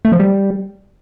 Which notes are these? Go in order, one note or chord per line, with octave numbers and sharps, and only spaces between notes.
A3
F3
G3